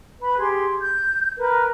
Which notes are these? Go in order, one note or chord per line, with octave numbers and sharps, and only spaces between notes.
B4 B5
G4 G#4 C6
G6
A#4 B4